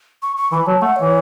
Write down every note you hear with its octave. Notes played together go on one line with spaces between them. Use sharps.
C#6
C#6
E3 B5
F#3 A5
A3 F#5
E3 C#5